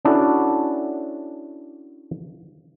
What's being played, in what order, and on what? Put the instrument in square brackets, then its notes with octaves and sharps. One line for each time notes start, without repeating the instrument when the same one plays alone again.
[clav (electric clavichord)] C#4 D4 E4 F#4 A4